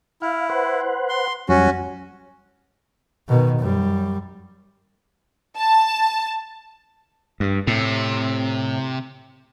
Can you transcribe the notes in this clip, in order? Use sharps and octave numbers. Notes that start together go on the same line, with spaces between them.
E4 F5
B4 C5 F#5
C6
F2 F#3 G3 C#4 F#4
B2 D#3
F#2 G3
A5
G2
A2 C3